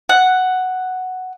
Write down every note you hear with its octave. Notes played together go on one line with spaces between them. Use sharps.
F#5